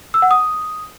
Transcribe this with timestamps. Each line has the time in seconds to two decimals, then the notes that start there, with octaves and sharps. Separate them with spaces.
0.14 E6
0.22 F#5
0.31 D#6